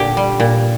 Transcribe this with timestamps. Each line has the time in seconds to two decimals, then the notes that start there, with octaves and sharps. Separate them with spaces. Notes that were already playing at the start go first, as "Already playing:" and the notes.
Already playing: A#2 D3 G4
0.17 G3
0.40 A#2